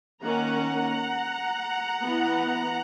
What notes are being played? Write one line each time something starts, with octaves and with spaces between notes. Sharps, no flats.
D#3 A#3 C#4 F#5 A#5
E3 B3